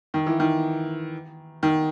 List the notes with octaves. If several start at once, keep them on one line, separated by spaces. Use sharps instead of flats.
D#3
E3
D#3
D#3